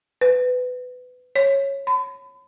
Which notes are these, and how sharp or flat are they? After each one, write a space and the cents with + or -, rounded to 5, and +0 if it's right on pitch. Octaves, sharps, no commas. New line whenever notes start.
B4 +20
C#5 -10
B5 +40